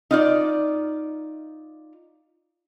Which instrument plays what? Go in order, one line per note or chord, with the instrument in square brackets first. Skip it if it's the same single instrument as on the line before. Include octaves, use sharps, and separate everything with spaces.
[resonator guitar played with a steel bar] D#4 F4 D5